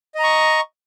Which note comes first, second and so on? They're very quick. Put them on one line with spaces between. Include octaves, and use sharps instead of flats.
D#5 A#5 C#6